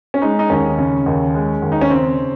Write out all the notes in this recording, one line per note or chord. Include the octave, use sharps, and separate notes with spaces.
C#4
G#3 D#4
D#4
D#2 C#4
C#3
D#2
G#3
D#2
D#4
C#4
C#3 C4